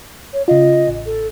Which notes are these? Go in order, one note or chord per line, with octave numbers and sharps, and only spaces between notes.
C#5
C#3 F4 D#5
A1
A4